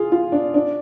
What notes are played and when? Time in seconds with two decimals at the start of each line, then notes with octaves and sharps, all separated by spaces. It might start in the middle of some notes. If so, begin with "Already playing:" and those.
Already playing: F4 G#4
0.12 F4
0.32 D4
0.54 D4